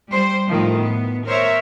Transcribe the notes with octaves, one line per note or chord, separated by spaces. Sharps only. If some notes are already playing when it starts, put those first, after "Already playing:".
G3 C5
A2 D#3 F3
B3
A#4 C5 C#5 E5